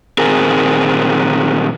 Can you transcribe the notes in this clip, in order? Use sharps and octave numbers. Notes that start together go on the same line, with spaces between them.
A#2 D#3 C4 G#4 A#4